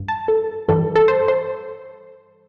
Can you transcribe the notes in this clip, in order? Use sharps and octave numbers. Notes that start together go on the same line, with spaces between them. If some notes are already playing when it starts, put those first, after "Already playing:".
Already playing: G2
A5
A4
G2 E3 G3 A4
A4
C5
C5